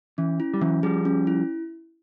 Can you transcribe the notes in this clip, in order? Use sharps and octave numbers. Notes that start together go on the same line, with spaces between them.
E3 C#4
E4
G3
E3 F#3 C#4
F3 G3 G#4
C#4
E4